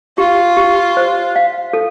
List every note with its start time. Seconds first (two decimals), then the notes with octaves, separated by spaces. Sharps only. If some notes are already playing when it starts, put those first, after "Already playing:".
0.18 F4 G4
0.57 G4
0.97 C5
1.36 F5
1.73 A4